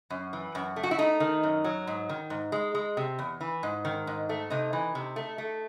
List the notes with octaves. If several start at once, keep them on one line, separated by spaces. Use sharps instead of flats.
F#2
E3
F#2
A3
F#4
E4
A3 D#4
D#3
F#2
F#3
G#2
D#3
G#2
G#3
G#3
C3
E2
E3
G#2
D#3
G#2
A3
C3 D#4
E3
C3
A3
A3